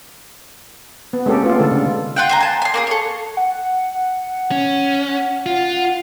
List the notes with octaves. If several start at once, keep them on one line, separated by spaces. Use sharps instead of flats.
B3
G#3 A#3 C4 C#4 G4 A4
A3 B3 F4
D3 G#3 A4
C#3
F4 F#5 G5
C5 G#5 A#5
G#5 A5
G#5 C6
A#3 F#4 G#4
A4 C#5
F#5
C#4
F4